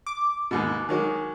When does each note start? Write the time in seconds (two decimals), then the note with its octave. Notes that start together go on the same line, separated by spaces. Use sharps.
0.06 D6
0.51 D#2 G#2 B2
0.89 D#3 F#3 G#3